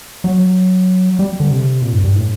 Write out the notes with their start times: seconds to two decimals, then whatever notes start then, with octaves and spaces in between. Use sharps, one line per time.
0.24 F#3
1.19 G3
1.40 D3
1.51 C3
1.82 A#2
1.93 G2
2.03 G2
2.14 A2